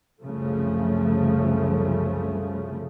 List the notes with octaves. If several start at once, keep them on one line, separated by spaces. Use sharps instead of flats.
C2 F#2 C#3 F3 A3